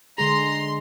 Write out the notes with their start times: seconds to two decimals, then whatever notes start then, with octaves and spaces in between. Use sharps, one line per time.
0.18 D3 G#3 G#4 A#5 C6